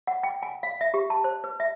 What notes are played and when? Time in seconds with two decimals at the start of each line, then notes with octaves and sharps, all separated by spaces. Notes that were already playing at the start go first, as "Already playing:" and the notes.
0.07 F#5
0.23 G5
0.43 G#5
0.63 F5
0.81 E5
0.94 G4
1.10 A5
1.24 C5
1.44 B4
1.60 E5